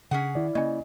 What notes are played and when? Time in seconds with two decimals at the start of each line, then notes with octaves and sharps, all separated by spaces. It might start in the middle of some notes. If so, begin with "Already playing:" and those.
0.11 C#3 C#4 G#4 F#5
0.35 D#3 E4 D5
0.55 C#3 A#3 C#4 D#5 G#5